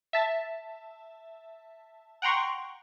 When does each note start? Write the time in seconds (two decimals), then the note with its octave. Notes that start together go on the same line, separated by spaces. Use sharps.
0.13 E5 A5
2.22 F#5 G5 A#5 C6 C#6